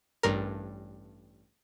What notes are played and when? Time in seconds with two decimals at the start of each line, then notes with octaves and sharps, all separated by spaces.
0.23 A1 G2 A#4